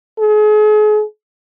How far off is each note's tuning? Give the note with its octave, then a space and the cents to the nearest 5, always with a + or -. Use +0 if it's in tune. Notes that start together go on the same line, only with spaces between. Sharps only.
G#4 +40